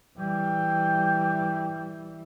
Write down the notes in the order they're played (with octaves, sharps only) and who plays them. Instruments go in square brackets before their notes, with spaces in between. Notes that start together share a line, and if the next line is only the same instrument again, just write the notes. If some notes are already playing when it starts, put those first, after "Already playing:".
[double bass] E3 G3 [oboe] G5